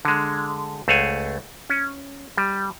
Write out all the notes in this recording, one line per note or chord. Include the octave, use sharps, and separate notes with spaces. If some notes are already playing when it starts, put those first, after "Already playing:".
D3 G#3
C#2 A3 C5 F5 F#5 G#5
C#4
G3